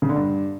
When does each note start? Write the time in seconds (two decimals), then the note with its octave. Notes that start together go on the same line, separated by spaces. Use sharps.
0.02 C#3
0.09 D3
0.16 G2